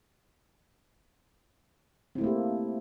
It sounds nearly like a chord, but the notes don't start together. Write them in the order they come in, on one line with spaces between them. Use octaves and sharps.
C4 E4 A3 A#3 G4